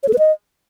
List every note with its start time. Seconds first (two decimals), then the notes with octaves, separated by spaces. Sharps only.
0.03 C#5
0.08 A4
0.13 B4
0.19 D#5